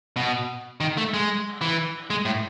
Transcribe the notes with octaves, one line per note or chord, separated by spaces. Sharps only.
B2
D#3
A3
G#3
E3
G#3
A2